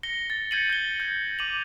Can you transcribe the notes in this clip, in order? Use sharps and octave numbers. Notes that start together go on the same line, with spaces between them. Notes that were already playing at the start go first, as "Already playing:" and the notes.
A#6 C#7 G7
A6
G6 G#6 A#6 C#7 D#7 F#7
G6 G7
G6
D6 D#7 F7 F#7